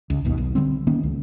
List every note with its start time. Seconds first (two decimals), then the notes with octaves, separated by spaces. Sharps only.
0.10 C#2
0.25 G1 D#2 B2
0.37 B1
0.55 D3 G3 C4
0.87 D#3 A#3 B3 C#4
1.03 C#2